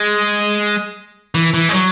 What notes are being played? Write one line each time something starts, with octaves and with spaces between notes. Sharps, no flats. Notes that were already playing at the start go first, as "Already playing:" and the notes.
Already playing: G#3
E3
E3
G#3
F#3